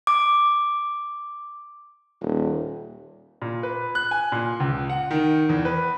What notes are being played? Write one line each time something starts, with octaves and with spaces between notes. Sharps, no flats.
D6
D#1
A#2
B4
F#6
G#5
A#2
C#2
F#5
D#3
E2
B4